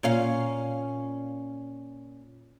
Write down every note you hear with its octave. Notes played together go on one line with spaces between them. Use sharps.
A#2 C#4 F5